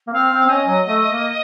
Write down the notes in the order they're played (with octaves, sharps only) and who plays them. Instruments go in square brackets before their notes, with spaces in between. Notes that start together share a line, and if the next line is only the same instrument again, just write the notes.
[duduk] A#3
[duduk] C4 [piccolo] F5
[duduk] C4
C4
[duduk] C#4 [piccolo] D#5
[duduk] F#3
A3
A#3